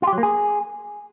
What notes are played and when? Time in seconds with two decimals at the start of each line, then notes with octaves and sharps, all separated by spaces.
0.02 F4
0.07 G4
0.13 F#3
0.18 A#3
0.23 G#4